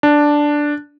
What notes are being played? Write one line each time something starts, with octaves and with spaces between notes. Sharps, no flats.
D4